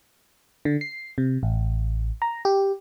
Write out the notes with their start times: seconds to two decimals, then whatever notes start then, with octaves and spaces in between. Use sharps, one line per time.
0.65 D3
0.81 C7
1.18 C3
1.43 A1
2.22 A#5
2.45 G4